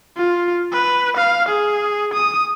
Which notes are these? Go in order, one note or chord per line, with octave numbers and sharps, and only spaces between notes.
F4
B4
F5
G#4
D#6